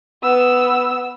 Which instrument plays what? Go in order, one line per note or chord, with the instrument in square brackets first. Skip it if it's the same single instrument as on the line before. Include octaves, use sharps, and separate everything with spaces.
[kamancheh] B3 E6